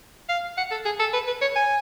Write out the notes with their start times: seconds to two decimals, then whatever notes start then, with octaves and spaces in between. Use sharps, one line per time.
0.29 F5
0.57 F#5
0.71 A4
0.85 G#4
0.99 A4
1.13 B4
1.27 B4
1.41 C#5
1.55 G#5